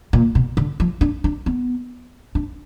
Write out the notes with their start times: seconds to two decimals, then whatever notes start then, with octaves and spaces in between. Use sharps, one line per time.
0.13 A#2
0.35 B2
0.57 D3
0.80 F3
1.01 D4
1.24 D4
1.46 B3
2.35 D4